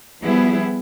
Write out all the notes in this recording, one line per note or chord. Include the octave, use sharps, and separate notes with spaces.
F3 G3 B3 E4 G#4